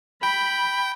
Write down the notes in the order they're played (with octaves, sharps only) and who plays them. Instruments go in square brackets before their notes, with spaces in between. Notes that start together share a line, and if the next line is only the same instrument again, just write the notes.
[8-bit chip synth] G5 [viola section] B5